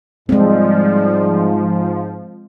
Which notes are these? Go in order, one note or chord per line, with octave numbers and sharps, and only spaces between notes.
G#2 F3 G3 G#3 C4